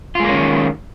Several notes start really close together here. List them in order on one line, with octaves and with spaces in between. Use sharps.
F4 G#3 A#3 C#4 D#3